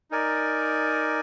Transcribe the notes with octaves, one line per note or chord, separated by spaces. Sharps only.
D#4 A#4 D5 G#5